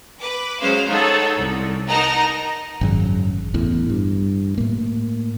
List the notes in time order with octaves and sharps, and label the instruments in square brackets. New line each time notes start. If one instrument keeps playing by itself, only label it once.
[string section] B4 D6
F#3 G#3 C#4 C5 F5
D#4 G#4 A4 C#5 F#5
C2
D#4 A#4 D#5 F#5 A5 A#5
[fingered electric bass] G#1 F#2 C#3
A1 E2 A2
G2
A2 A#3